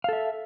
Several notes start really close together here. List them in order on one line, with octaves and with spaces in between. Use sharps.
F5 A4 E5